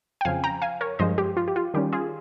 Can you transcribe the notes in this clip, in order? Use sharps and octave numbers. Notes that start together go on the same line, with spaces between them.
G5
F2 C#3 F3 F5 G#5
G5 A#5
F5 G#5
A#4 C#5
G2 F3 G#3 C5 D#5
G4
F4
G4
F4
D#3 G3 C#4 G4
F4 G#4